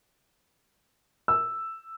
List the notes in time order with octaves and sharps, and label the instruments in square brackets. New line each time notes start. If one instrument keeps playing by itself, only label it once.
[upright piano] E6